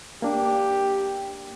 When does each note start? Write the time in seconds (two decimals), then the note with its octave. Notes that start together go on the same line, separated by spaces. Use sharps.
0.22 A#3 D4 G4